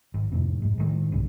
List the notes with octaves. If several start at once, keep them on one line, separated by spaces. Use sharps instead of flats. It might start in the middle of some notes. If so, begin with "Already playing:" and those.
G#1
F1 F2 A2 C3
G#2 G#3
A2 D#3 G#3
B1 G2 C#3